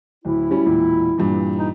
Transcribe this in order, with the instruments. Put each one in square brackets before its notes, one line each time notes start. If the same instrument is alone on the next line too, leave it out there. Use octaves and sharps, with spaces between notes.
[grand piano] D1 [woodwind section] E4
[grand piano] F#3 G3 C#4
E1 A#2
G2 A#2 E3
[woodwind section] D#4